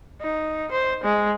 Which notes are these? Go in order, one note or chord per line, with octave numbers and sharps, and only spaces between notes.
D#4
C5
G#3